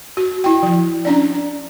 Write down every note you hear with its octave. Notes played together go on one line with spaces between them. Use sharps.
F#4
E4 G5
F3
C#4 D4 D5